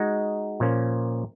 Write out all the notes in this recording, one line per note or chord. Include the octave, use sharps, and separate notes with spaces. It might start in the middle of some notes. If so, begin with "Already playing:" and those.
Already playing: G#3 D#4 F#4
A#2 F3 A#3 C#4